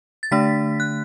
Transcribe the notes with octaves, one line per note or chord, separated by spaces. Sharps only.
A6
D3 A3 D4 B6
F#6